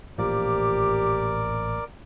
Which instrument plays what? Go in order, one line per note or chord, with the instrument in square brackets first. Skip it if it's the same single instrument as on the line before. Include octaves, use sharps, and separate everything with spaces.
[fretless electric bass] A1 A#2 F3 [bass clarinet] G4 [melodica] A#4 D5